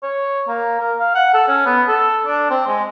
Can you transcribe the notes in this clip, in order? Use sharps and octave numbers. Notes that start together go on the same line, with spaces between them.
C#5
A#3
A#4
F5
F#5
A4
C#4
B3
A4
D4
C4
G#3